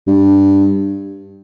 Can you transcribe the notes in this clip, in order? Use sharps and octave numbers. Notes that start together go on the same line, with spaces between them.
G2